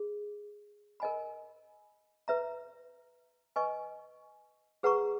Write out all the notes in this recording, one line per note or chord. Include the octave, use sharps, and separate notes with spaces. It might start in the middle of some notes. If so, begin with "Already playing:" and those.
Already playing: G#4
A#4 D#5 G#5 B5
B4 E5 A#5
B4 D#5 G#5 C#6
G#4 B4 F#5 A#5 C#6